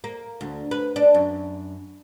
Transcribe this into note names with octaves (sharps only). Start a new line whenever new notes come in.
A#3
D2
B4
D4
F#2